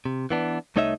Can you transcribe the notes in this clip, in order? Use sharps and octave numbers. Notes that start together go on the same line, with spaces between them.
C3
E3 B3 D4
C2 A3 D#4 C#5 D#5 E5